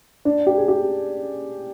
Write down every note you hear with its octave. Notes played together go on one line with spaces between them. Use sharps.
D4
G4
G#4
G4